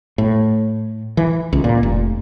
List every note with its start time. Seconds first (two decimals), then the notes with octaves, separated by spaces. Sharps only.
0.18 A2
1.17 E3
1.53 C#2
1.64 A#2
1.83 F1